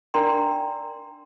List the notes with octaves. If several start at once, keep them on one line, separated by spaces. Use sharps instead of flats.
D4 A#4 D5 G5 A#5 C6